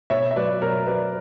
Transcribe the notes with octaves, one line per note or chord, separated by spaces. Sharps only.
B2 C#5 E5
E5
F#3 B4 D5
B2 A#4 C#5
F#3 B4 D5